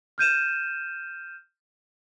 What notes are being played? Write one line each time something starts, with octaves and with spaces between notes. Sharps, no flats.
F6 G6 D#7 E7